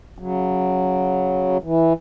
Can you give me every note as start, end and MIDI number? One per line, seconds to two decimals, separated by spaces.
0.18 1.58 49
0.18 1.58 54
1.63 1.93 52